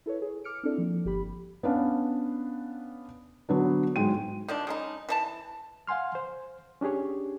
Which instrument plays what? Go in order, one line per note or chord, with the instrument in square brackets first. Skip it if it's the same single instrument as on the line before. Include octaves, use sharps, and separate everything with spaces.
[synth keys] E4 A4 B4 C#5
G#4
D6 F6 C#7 D7
C4 D4 E4 A4 D5
F3 A#3
G1 G4 B5
[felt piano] B3 C#4 D4 F5
D3 F#3 B3 D4
G#2 F#3 G#3 G5 D#7
[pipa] D#3 F3 D4
C#3 G#3 D#4
E3 D#4 A5
[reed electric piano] F5 F#5 G#5 C6 F6
C5
C#4 D4 G4 G#4 C#5